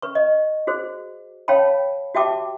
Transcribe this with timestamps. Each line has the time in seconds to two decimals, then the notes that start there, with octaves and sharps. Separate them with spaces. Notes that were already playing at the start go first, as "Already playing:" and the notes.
0.02 B4 C#6
0.15 D#5
0.67 F#4 G#4 C5
1.48 C#5 F5 G5 A5 B5
2.15 F#4 G4 E5 G5 A5 D6